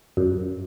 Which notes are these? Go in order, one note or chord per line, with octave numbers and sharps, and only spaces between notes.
F#2